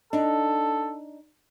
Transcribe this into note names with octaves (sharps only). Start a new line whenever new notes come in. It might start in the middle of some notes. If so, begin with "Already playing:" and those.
D4 D#4 A4